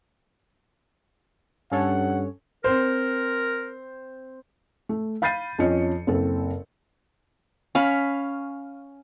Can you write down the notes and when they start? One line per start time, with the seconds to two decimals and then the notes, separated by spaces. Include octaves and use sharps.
1.72 G2 C#4 A4 C#5 F#5
2.64 C4 A#4 C5
4.89 A3
5.22 F5 B5 G6 A6 C7 D#7
5.58 F2 F3 C#4 D#5 C#7
6.07 F#1 C4 A4
7.75 C#4 F5 B5